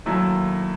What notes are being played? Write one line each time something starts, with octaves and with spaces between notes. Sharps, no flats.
D#2 D#3 F#3 A3 E4